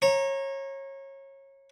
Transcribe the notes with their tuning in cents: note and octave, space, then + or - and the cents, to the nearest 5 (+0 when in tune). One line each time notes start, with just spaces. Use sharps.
C#5 -25 A#5 +0